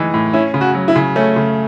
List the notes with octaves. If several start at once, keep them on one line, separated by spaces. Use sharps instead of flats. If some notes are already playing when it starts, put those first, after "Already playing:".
Already playing: A2 E3 G#3 D#4
A2
C#4 E4
C#3
F#4
F#3
E4
C#3
A3 C#4
C#3